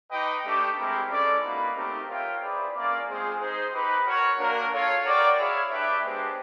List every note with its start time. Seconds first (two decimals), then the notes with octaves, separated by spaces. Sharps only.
0.11 D#4 G4 B4 D#5 G5
0.44 A3 D4 G4
0.77 G#3 C4 E4 G4 A#4
1.09 G#3 C#4 E4 A4 D5
1.42 A#3 D#4 F#4 B4
1.74 A3 C4 D#4 G4 A#4
2.08 F4 A#4 C#5 E5 G5
2.40 C4 E4 G#4 B4 D5
2.73 A#3 C#4 F4 A#4 D5
3.06 G#3 C4 F4 G#4 C5
3.38 D#4 G#4 C5
3.72 D#4 G4 B4
4.04 F#4 A#4 C#5
4.38 A#3 D4 F#4 A#4
4.70 F4 A4 C#5 F5
5.03 F#4 A#4 D5 G5
5.36 E4 G#4 C#5 F5
5.69 D4 G4 B4 E5
6.02 G#3 B3 D4 G4 C5